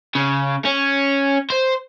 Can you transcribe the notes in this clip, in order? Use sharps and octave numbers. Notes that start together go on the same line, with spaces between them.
C#3
C#4
C5